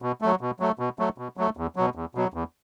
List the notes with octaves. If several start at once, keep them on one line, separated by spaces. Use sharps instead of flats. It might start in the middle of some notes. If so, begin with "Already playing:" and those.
B2
F#3 A3
B2
F#3 A3
B2
F#3 A3
B2
F#3 A3
E2
B2 F#3
E2
B2 F#3
E2